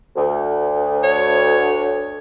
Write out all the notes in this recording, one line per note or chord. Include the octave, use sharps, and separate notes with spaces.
D2
C#5